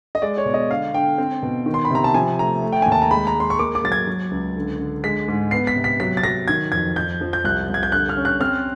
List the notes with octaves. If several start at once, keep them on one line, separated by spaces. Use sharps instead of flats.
D#5
G#3 D5
C#5
B2
D#5
D3 F5
D3 G5
C4
B2
D#3
C6
B5
C3 A#5
A5
F3 G#5
A3 A#5
A3
G5
D#2 G#5
A5
A#5
G#3 B5
A#5
G#3
C6
C#6
A#3 D6
D6
F#3 A6
G#6
F#3
C#2
D3
D3
G#3 B6
G#2
B3 C7
B6
C3
B6
F#3 B6
A6
F#3 A#6
D#3 G#6
F2 G#6
F2 G6
F3
G6
C2 F#6
C2
G#6
G6
D3 F#6
F6
C#4
F#6
C4 F6